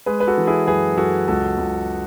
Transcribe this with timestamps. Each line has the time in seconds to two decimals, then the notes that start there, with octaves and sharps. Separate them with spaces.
0.06 G#3 G#4 B4
0.20 B4
0.27 F#4 A4
0.37 E3
0.47 E4 G#4
0.67 F#2 G#4 B4
0.97 F#2 F#4 A4
1.28 C#2 F#4 A4
1.58 C#2